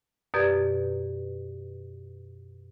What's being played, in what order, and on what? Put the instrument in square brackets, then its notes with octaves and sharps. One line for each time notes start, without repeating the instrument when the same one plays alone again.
[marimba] F#2 B2 G4 B4 D5 G#6